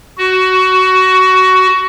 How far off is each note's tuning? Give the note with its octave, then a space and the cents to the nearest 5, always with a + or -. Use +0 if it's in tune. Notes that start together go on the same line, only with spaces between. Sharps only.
F#4 +15